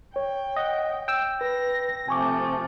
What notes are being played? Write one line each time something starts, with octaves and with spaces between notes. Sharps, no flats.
C#5 G5
D#5 F#5
G5 E6
B4 A#6
C3 F3 A3 G#5 C#6 D6